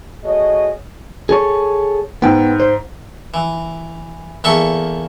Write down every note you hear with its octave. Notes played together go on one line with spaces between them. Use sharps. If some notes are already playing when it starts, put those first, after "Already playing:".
A3 F#4 G#4 C#5 D#5
G#4 A4 C#5
G#2 B3 G5
C5
E3
E2 A#3 A4 E5 C#6